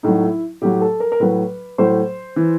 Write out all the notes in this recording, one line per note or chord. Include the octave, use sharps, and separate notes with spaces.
A2 F#3 D#4
E4
A2 F#3 G4
A4
A#4
A#4
A2 F#3 B4
A2 F#3 C5
E3